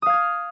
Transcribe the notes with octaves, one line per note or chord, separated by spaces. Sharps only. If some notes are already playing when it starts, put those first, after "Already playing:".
F5 D#6 F6 G#6